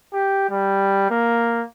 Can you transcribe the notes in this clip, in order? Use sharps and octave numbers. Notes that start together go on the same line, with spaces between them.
G4
G3
A#3